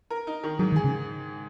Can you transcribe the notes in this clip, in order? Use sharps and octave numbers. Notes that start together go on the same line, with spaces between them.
A#4
D#4
D#3
G#2 F#3
D#3
G#4
C#3